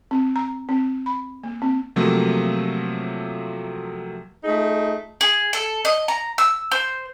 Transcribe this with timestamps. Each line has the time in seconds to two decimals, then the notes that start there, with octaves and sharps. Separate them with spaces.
0.11 C4
0.36 A#5
0.69 C4
1.06 B5
1.44 A#3
1.62 C4
1.96 C3 F3 F#3 A3 A#3
4.44 A3 D#4 F4 G#4
5.21 G#4
5.53 A4
5.85 D#5
6.08 A#5
6.38 E6
6.72 C5